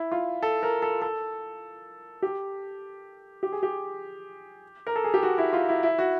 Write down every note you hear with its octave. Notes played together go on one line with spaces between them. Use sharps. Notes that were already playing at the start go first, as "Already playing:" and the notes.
Already playing: E4
F4
A4
A#4
A4
A4
G4
G4
G#4
G4
A#4
A4
G#4
G4
F#4
E4
F4
E4
E4
F#4